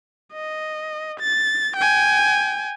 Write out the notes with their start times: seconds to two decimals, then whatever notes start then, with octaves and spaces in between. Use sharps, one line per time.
0.33 D#5
1.20 A6
1.77 G5 G#5